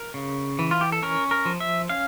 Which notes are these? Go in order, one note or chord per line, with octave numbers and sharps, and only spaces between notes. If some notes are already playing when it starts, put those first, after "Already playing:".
Already playing: A#4
C#3
E3
F4
G4
A4
C#4 A#4
A#4
F3
E5
C#4 F5